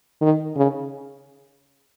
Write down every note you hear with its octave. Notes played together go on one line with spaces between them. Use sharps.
D#3
C#3